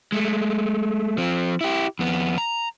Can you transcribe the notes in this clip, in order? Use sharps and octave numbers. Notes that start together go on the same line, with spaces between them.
G#3 A3
F3 C4
E4 G4
F2 B3
A#5